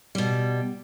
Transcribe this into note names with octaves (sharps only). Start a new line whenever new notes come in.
B2 G3